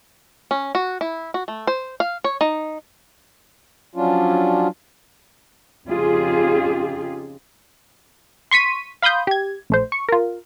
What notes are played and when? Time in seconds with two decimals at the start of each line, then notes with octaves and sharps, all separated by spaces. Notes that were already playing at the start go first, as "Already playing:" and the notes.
0.51 C#4
0.75 F#4
1.01 E4
1.34 F#4
1.48 A3
1.67 C5
2.00 F5
2.24 C#5
2.41 D#4
3.96 F3 F#3 C#4 D4 F4
5.86 F2 C#3 D#4 F4 G4 G#4
8.51 C6 C#6 B6 D#7
9.02 F5 B5 C6 D#6 G6
9.27 G4 G#6
9.70 A#1 A3 C5
9.92 C#6
10.09 F4 A#4